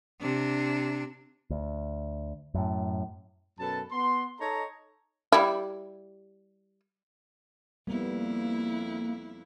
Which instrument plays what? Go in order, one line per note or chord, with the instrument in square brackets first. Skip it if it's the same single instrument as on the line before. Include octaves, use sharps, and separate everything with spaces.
[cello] C3 D4
[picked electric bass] D2
F#2 A2
[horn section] F#2 B2 A4 B4 A5
B3 C6
D#4 A4 C#5 D#5 A5 A#5
[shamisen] G3 E4
[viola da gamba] F2 E4 [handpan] G3 B3 [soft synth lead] A#3